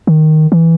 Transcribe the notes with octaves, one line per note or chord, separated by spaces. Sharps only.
D#3
E3